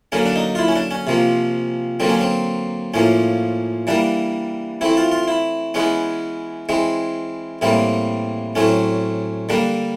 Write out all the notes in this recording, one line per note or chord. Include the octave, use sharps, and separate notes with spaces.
D3 F#3 A#3 C#4
D4
D#4
F4
E4
C#4
D4
C#4
C3 F3 A#3
D3 F#3 A#3 C4
C#4
C4
A2 F3 A#3 C#4
E3 G3 A#3 D4
E3 A3 C4 E4
F4
F4
E4
E3 G#3 B3 C#4
E3 G#3 C4
A2 E3 G3 A#3 C4
A2 F#3 A3 C4 C#4
D3 G3 A#3 D4